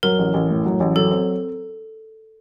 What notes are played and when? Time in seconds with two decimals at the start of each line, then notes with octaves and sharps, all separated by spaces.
0.03 F#3 A#4
0.19 A1
0.34 A1
0.49 A2
0.65 F#3
0.80 A1
0.96 F#3 A4
1.11 C4